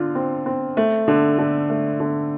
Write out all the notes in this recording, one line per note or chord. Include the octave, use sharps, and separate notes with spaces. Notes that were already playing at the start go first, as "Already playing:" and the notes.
Already playing: D3 F4
C4
C4
A3
D3
D3
A3
D3